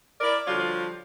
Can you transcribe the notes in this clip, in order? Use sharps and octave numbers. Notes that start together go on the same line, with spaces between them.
E4 A#4 D5
D3 F3 G3 F4 F#4 C#5